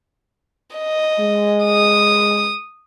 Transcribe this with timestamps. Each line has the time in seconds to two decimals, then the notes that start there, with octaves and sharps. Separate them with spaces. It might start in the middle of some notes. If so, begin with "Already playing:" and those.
0.77 D#5
1.19 G#3
1.64 D#6